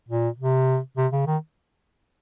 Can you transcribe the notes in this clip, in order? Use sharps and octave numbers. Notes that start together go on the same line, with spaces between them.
A#2
C3
C3
C#3
D#3